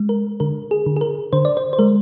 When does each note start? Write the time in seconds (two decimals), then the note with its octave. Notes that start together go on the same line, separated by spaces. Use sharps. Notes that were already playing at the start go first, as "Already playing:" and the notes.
Already playing: G#3
0.09 A#4
0.40 D3 A#4
0.71 G#4
0.86 D3
0.96 G#4
1.01 A#4
1.33 D3 C5
1.45 D5
1.57 C5
1.73 C5
1.79 G#3 A#4